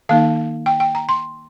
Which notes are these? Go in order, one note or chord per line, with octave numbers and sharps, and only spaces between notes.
D#3 A#3 D#4 F5
G5
G5
A#5
C6